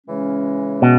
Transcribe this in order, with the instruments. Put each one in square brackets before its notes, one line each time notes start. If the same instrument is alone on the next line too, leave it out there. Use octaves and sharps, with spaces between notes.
[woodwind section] C#3 E3 G#3 C#4
[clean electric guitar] B2